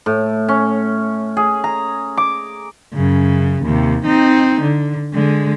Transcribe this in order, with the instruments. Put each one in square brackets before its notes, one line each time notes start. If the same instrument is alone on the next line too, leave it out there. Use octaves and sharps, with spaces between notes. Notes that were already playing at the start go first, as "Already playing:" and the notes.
[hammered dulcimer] A2
C#4
G#4
A#5
D6
[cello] F#2 C#3
D#2 C3
C4 D#4
D3
D3 G#3